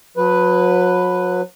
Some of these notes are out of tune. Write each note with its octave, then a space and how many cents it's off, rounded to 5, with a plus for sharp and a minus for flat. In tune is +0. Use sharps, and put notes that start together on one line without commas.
F#3 -35 B4 +0